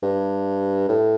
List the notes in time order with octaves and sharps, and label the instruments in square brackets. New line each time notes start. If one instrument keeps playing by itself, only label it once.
[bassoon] G2
A2